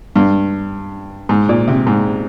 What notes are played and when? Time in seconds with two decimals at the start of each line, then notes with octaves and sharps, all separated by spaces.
0.16 G2
1.29 G#2
1.49 A#2
1.68 C3
1.87 G#2